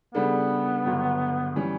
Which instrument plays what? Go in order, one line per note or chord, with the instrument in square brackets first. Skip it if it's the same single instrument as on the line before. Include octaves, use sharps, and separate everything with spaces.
[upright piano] C#3 G3 D4 A4 [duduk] B3
[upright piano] G1 G2 D3 F#3
E3 G3 C#4